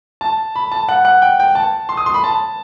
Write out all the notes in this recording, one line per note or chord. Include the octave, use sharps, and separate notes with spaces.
A5
B5
A5
F#5
F#5
G5
G5
A5
C6
D#6
C6
B5
A5